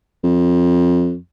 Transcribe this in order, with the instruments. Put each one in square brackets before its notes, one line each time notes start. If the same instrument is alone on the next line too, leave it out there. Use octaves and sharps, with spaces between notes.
[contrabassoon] F2